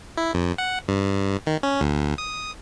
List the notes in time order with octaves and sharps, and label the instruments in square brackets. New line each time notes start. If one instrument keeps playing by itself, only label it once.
[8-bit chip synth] E4
F2
F#5
G2
D#3
C#4
D2
D#6